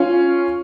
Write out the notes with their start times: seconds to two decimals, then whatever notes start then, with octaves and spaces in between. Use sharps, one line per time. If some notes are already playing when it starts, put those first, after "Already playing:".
Already playing: C#4 F4